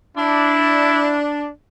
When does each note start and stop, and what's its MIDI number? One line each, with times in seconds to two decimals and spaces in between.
0.17 1.47 62
0.17 1.21 64